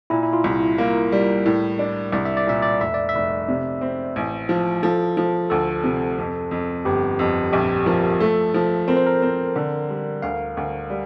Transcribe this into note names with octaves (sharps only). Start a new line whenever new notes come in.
A#2 E4
E4
F4
C2
A#3 A#4
G3
A2
D4
C2 D5
E5
D5
A#2 E5
D5
F1 E5
D5
E5
F1
C3
C4
A1
F3
F3 A4
F3
D2 A4
C3
F2
F2
G1 G4
F2
A#1 G4
F3 A#4
A3 A4
F3
C4 A#4
C5
A#4
C4
D3
G3
D2 F5
D2
G3